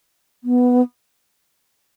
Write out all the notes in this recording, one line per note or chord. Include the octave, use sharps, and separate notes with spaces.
B3